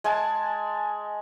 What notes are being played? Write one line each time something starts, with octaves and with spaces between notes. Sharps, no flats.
G#3 G#5 A5